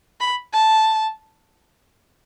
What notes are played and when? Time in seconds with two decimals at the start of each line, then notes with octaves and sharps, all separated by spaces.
0.20 B5
0.53 A5